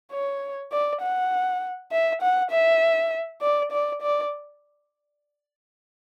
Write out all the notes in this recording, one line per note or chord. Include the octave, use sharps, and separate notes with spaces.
C#5
D5
F#5
E5
F#5
E5
D5
D5
D5